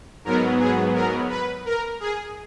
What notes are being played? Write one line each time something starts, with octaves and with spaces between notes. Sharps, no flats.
G#2 F#3 B3 A#4
G#4
A#4
B4
A#4
G#4